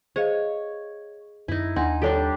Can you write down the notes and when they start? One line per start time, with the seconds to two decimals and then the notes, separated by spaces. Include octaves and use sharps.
0.16 G#4 C5 C#5 D#5 F5
1.48 F#2 D#4 E4
1.76 D#2 D4 D#4 F#5 C6
2.02 G3 D4 D#4 G4 A4 C#5